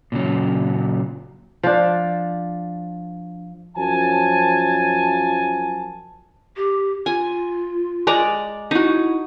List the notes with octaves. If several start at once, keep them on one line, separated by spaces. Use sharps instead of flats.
A#2 C#3 F#3
F3 D4
F#2 F3 F#3 G#5 A5
G4
F4 G#5
G#3 D5 A#5
D#4 E4 F#4